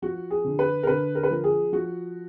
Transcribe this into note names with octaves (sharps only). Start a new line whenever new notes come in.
F3 F#4
G#4
D3
B4
A#4
D3 B4
A#4
B4
F3 A#4
G#4
F3 F#4